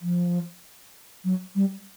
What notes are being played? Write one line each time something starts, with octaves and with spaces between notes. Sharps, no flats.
F3
F#3
G3